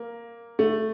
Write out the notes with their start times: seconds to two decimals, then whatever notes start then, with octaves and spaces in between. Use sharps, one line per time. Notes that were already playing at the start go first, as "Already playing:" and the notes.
Already playing: A#3
0.59 A3